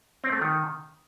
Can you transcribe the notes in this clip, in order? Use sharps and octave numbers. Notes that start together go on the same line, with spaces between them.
C4
A3
D#3